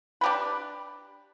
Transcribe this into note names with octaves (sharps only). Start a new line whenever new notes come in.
D4 G4 B4